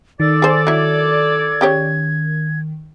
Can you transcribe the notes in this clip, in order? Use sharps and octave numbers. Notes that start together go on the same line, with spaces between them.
D#3 A4 D5 A6
G#4 C5
F#3 E4 G#6
C#3 G4 C#5